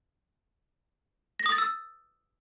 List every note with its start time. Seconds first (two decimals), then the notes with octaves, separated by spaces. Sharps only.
1.40 A#6
1.46 D#6
1.52 A6
1.58 E6